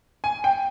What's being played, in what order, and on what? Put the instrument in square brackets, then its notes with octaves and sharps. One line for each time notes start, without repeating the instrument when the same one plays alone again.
[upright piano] G#5
G5